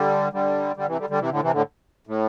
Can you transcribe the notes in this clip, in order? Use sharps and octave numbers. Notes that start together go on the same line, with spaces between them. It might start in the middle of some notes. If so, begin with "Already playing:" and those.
Already playing: D3 G3
D3 G3
D3 G3
C3 E3
D3 G3
D3 G3
C3 E3
A2 D3
C3 E3
A2 D3
A2